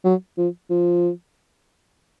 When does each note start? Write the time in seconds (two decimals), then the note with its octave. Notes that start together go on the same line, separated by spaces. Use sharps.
0.04 F#3
0.38 F3
0.70 F3